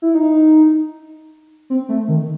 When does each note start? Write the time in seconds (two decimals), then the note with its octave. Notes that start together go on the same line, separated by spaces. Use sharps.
0.02 E4
0.15 D#4
1.70 C4
1.89 A3
2.08 D#3